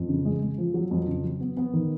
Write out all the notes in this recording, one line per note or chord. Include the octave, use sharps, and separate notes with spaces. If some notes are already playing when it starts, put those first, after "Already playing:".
Already playing: F2
C#3
G#3
G#3
F3
F#3
F2
C#3
F#3
B3
B3
D#3